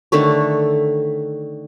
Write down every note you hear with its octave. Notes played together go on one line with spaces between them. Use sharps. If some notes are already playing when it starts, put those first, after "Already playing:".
D3 D#3 A3 C#5